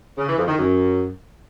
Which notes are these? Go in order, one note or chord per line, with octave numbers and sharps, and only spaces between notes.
C#3
E3
F2
D#3
F#2